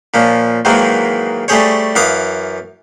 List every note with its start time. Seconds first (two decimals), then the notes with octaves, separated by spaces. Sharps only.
0.14 A#2 F3 C#4
0.65 G#2 D#3 E3 F#3 G#3 A#3
1.48 G3 A3 C#4 G#4 C5 C#5
1.95 F#2 E3 F5 D6 D#6